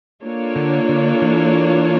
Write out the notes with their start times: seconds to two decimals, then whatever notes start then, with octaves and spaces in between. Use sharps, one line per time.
0.23 A#3 D4 F4 A4 C#5
0.56 D3
0.89 D3
1.22 E3